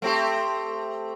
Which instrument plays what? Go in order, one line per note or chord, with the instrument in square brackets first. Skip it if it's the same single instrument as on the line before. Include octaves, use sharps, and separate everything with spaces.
[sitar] A3 C4 G4